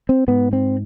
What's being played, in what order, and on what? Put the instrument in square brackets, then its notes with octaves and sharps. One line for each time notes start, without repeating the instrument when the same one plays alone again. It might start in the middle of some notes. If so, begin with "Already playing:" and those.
[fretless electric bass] C4
G#2 B3
C4